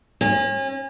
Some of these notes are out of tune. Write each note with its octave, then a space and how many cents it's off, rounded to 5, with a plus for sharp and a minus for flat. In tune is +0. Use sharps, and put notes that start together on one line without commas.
C#4 -35